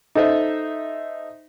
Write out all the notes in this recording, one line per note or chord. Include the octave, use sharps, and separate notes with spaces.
D#4 A4 C5 D#5 E5